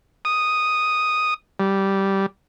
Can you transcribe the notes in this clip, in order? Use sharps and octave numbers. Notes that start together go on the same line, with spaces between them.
D#6
G3